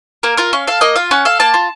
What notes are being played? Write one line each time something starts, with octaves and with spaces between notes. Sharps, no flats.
A#3 A#4
F4 A#4
C#4 F5
A4 F5
A#3 D#5
F4 F5
C#4 F#5
A4 F5
A#3 A5
F4